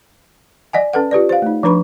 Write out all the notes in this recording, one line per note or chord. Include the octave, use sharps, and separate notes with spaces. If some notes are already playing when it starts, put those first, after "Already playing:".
D5 D#5 F#5 G#5
C#4 A4 B4 F#5
F4 G4 B4 D5
C5 F5
A3 D#4
F3 D4 B4 B5 C#6